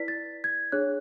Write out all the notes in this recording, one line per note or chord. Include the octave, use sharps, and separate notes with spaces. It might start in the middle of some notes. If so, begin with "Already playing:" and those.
Already playing: E4 B4 D5 B6
A6
G#6
D4 G#4 C#5 F#6